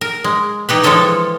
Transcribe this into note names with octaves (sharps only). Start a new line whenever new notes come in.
A#4
G#3
E3 D#4 G4 B4
E3 F3 G#3 G4 A4 C#5